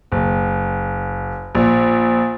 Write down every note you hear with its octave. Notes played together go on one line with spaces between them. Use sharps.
F#1
A#1